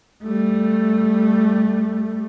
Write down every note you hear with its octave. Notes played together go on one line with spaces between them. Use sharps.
G3 A3